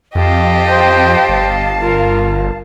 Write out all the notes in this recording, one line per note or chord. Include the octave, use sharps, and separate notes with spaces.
F2 G4 D#5 F5 A5
C5 G5
G1
F4 A#4